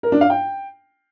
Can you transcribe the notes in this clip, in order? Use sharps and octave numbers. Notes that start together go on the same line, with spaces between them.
A#4
D4
F5
G5